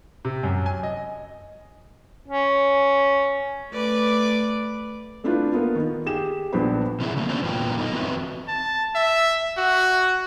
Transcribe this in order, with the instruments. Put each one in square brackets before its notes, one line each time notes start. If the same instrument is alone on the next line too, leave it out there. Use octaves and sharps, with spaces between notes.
[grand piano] C3
F#2
G#5
D#5
[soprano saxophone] C#4
[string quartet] A3 B4 D5 D6
[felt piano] A3 C4 D4 E4 F4 B4
A#3 B3 F4
D#3
G4 G#4 E7
A#1 B3 D4 B4 C5 B5
[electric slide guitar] C3 E3 E4 G#4
C#3 F#3 A3 A#3
B3 C#4 D4 F#4 C5
E2 A#2 E3 B3 F4 G5
F#3 B3 D#4 A4 D#5
E2 C4 F#4 B4 E5
[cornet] A5
E5
F#4